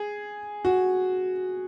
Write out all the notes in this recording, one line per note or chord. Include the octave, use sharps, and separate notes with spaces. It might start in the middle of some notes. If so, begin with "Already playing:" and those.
Already playing: G#4
F#4